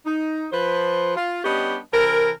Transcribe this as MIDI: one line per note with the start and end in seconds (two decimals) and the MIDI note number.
0.06 0.47 63
0.52 1.14 53
0.52 1.14 71
0.52 1.14 72
1.16 1.43 65
1.44 1.78 55
1.44 1.78 59
1.44 1.78 61
1.44 1.78 62
1.44 1.78 67
1.44 1.78 75
1.93 2.31 48
1.93 2.31 52
1.93 2.31 69
1.93 2.31 70